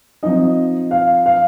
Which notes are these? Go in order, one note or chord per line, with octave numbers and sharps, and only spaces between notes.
F3 C4 D#4 D#5
F5
F5